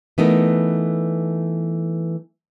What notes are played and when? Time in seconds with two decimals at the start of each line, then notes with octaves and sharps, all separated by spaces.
0.18 E3 A3 B3 D#4 A#4